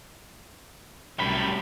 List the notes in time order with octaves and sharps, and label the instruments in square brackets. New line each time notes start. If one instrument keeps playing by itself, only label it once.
[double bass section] C2 [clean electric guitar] F#2 B5 [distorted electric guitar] A2 G3